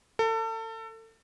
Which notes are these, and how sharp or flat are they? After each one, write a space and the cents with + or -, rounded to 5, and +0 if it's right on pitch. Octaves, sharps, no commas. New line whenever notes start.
A4 +35